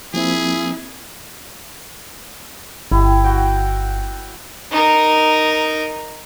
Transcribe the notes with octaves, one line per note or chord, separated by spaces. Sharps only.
F3 A#3 C4 E4 G#4
G1 E4 G4
F#4 F#5 G5
D#4 A#4